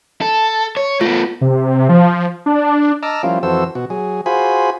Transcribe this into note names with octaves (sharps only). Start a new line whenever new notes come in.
A4
C#5
A3 B3 F4
C3
F3
D4
D#5 A5 A#5 D6 E6 F6
F3 G3 A#3 C#4 E4 F4
F2 E3 F#4 A4 C5 E6
B2 F#4
F#3 G#4
F4 F#4 G#4 C5 G#5 B5